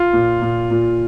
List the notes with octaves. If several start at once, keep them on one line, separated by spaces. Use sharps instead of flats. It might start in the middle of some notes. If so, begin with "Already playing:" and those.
Already playing: F4
A#2
A#2
A#2